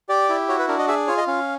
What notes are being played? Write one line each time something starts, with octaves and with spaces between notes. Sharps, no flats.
G4 D5
E4
F#4 C#5
B4
D4 A#4
D#5
G#4 E5
F4 C#5
D#5
C#4 F5